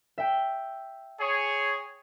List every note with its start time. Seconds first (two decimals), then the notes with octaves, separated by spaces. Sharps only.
0.18 E5 G5
1.20 G#4 C#5